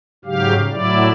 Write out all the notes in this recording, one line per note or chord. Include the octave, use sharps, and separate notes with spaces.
G#2 C#3 F#3 G4 F5
A2 F#3 E4 D5